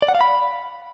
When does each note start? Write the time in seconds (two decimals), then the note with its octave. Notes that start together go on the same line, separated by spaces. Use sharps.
0.02 D5
0.08 F#5
0.15 F5
0.21 B5